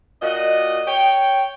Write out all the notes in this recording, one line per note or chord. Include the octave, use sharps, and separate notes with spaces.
A#2 F#4 D#5
C#5 G5